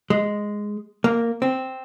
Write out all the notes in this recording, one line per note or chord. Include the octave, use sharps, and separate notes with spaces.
G#3
A#3
C4